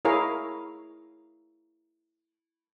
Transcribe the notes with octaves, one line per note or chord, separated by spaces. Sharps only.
E4 G#4 A#4 C#5 F5